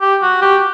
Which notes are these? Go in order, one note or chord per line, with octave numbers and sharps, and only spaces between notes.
G4
F#4
G4